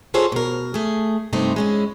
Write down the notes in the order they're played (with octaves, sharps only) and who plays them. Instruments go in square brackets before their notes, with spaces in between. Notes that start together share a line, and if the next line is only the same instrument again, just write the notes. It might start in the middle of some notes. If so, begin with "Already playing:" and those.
[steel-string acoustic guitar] F4 G#4 A4 C5 C#5
B2 A#4
A3 G#4
G2 C3 A3 C4 D#4
G#3 C#4 E4